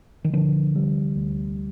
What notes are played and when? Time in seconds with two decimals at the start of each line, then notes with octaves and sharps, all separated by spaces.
0.25 D#3
0.33 D2 D3 F3
0.75 C3 G3
1.16 D2